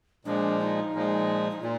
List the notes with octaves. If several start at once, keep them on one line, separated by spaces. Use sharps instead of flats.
A#2 F3 G#3 D4
D#4
A#2 F3 G#3
D#4
A#2 F4